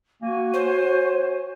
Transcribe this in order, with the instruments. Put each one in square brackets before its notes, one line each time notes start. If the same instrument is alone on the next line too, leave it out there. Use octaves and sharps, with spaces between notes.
[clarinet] A#3 [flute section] F#4 G#5
[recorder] C5 [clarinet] C#5